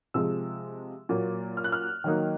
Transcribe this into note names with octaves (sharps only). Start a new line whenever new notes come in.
C3 F3 G#3 E6
A#2 F#3 A#3
F6
F#6
F6
D#3 F#3 A#3 D#4